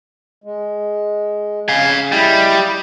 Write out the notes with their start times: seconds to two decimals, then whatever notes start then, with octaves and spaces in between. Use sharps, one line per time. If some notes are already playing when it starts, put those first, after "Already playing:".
0.44 G#3
1.69 C#3 F5 G#5
2.12 G3 E4 D#5